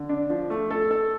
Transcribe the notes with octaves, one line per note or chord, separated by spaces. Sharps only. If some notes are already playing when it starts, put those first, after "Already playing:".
Already playing: D3
D4
F3
A3
A4
A4